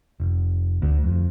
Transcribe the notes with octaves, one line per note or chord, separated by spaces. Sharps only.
F1
D2
F2